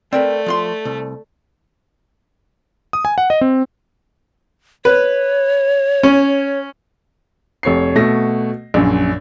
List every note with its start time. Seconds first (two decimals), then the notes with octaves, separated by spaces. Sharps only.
0.13 A3 C4 A#4 B4 D5
0.46 F3 F4 C6
0.85 C2
2.93 D#6
3.05 G#5
3.18 F#5
3.30 D#5
3.41 C4
4.85 B4 C#5
6.03 C#4
7.63 F1 C#5 C7
7.95 B2 A3 F#4 A#6
8.74 A#1 F#2